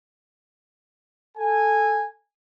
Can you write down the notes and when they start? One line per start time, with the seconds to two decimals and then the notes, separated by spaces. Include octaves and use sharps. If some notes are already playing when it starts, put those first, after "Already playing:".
1.36 A4 G#5